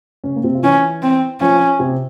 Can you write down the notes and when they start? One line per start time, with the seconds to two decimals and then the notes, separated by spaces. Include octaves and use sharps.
0.24 C#3 C#4
0.36 A#3
0.43 C3 C4
0.55 F4
0.62 E3 C#4 E4
1.03 C4
1.41 F3 C#4 F4
1.79 C3 C4